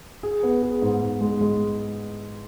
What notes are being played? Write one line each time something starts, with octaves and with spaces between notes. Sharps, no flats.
G#4
B3
G#4
G#2
G#2
G#3
G#3